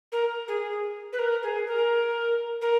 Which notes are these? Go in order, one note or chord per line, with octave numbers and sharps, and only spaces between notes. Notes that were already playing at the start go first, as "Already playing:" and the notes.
A#4
G#4
B4
A#4
G#4
A#4
A#4